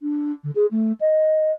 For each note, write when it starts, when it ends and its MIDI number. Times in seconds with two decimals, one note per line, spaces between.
0.02 0.32 62
0.44 0.51 50
0.55 0.66 68
0.71 0.92 57
1.00 1.52 75